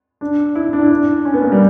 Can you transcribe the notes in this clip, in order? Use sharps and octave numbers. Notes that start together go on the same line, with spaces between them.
D4
E4
D4
E4
D4
C#4
B3
A#3
G3